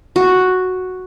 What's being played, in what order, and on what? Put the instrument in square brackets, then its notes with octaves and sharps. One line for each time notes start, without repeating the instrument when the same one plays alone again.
[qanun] F#4